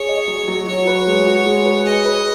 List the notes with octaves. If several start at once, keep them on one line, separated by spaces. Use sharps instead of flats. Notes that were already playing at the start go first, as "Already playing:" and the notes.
Already playing: G#4 C#5
D#5
F#3
F#3
F#4 C#5
B4
G#3
F#4
G#3
B4
G#4 D#5
B4